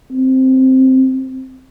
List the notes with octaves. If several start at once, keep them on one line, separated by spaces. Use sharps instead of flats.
C4